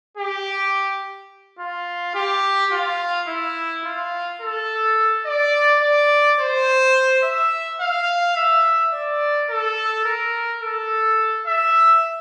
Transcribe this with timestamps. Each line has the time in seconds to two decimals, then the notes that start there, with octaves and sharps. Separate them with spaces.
0.17 G4
1.59 F4
2.15 G4
2.72 F4
3.28 E4
3.85 F4
4.41 A4
5.25 D5
5.82 D5
6.39 C5
7.23 E5
7.80 F5
8.36 E5
8.93 D5
9.50 A4
10.05 A#4
10.62 A4
11.46 E5